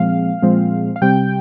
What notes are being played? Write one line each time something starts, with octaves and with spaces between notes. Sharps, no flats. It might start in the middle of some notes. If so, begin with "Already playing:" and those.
Already playing: A#2 F3 G#3 C4 F5
A#2 F3 G#3 C4
F5
C3 G3 C4 G5